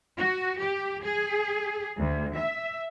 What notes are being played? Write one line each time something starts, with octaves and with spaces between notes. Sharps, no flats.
F#4
G4
G#4
D2
E5